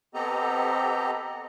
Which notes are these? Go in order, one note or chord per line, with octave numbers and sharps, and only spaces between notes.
B3 C4 G4 A4 D#5 A#5